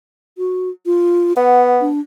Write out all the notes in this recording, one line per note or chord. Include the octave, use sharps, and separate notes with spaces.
F#4
F4
B3 F#5
D4